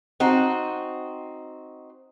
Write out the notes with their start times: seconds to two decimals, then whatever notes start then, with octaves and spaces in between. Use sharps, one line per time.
0.20 C4 D#4 F#4